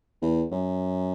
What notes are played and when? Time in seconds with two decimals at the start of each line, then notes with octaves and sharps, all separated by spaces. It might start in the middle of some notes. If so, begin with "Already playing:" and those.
0.22 E2
0.51 F#2